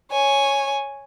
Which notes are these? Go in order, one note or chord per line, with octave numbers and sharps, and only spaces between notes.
C#5 G#5